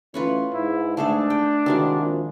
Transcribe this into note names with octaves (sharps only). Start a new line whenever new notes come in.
E3 A3 C#4 F4 B4 C#5
G#2 E4
A3 D4 G#4 A4
G5
C3 D#3 G#3 E4 F#4 F5
A#1